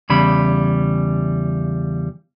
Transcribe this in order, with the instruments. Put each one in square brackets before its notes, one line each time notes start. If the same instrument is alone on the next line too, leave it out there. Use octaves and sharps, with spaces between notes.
[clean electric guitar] E2 C#3 G3 B5